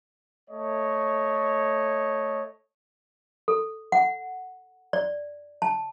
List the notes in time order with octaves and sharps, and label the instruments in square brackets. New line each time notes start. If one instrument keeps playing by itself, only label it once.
[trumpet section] A3 C#5 D#5
[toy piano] A4
F#5
D5
A5